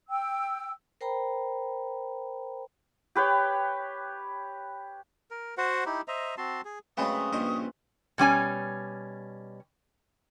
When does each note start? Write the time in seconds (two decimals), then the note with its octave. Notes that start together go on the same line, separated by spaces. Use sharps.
0.09 G5 E6
1.01 A#4 C5 G5 A#5 B5
3.15 G4 B4 C#5 G5
5.31 A#4
5.58 F#4 C5 F#5
5.86 D#4 E4 G4
6.08 C5 D#5 E5 A#5
6.38 C4 F#4 A5 C6
6.65 G#4
6.97 C#3 F#3 G#3 A3 C4 B4 C#6 D#6
7.33 A#1 G2 F4 D#5
8.18 B2 G3 C#4 G#5